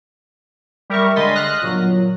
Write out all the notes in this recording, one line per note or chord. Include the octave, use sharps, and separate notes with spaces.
G3 A#4 E5 C#6
D3 G#3 D#5 C6 A6 B6
D#6 F6 F#6 A#6
G1 A#2 F#3